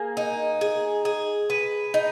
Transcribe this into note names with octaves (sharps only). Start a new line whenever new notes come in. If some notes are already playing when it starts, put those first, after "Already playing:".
Already playing: A#3 G#4
D#4
G#4
G#4
B4
D#4